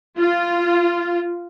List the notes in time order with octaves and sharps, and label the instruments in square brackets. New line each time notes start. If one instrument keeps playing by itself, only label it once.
[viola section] F4